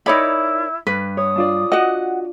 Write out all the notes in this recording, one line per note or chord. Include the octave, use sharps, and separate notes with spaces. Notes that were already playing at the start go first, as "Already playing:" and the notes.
D#4 E4 A#4 C#5 D5 B5
G2 B4
C#5 D#6
D4 F4 D5
F#4 D#5 F#5